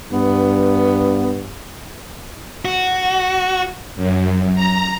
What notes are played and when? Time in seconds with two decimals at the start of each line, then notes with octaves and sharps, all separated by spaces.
0.13 G2 B3
2.65 F#4
3.96 F#2
4.55 A#5